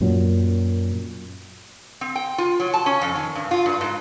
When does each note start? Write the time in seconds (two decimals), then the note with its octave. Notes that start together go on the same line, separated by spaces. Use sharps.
0.01 F#2 A#2 F#3
2.01 C4
2.15 G5
2.38 F4
2.60 F#3
2.73 A5
2.86 C#4
3.01 F2
3.15 D#3
3.35 G2
3.51 F4
3.66 G2
3.81 G#2